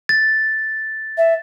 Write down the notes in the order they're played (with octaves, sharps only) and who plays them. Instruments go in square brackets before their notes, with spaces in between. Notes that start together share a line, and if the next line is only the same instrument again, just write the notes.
[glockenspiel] A6
[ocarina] E5